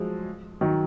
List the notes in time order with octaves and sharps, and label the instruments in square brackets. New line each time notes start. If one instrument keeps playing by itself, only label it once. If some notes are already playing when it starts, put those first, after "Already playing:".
Already playing: [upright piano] F3 F#3 G#3
D#3 F#3